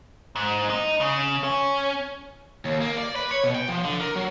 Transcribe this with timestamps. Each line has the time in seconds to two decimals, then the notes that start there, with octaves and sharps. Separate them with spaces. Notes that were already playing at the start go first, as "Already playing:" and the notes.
0.36 G#2
0.70 D#4
1.01 C#3
1.44 C#4
2.65 D#2
2.81 A#3
2.98 D5
3.16 B4
3.32 C#5
3.44 B2
3.55 G5
3.69 F3
3.84 D3
4.01 A#4
4.15 F#3